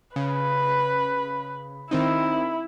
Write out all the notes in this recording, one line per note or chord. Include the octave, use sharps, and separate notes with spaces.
C#3 B4
D#3 C4 D#4 E4